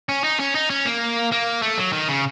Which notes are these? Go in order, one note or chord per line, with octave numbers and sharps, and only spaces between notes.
C#4
D#4
C#4
D#4
C#4
A#3
A#3
A3
F#3
D#3
C#3